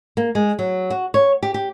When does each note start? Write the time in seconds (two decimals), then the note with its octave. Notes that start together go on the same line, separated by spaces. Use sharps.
0.17 A#3
0.35 G#3
0.59 F#3
0.90 F#4
1.14 C#5
1.43 G4
1.54 G4